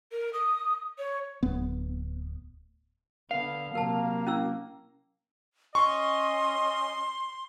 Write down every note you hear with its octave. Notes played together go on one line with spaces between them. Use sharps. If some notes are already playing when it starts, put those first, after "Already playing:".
A#4
D#6
C#5
D1 B3
D3 B3 F5
C3 F#3 A#3 A#4 A5
C#4 E4 E6
C#4 D#5 C6 C#6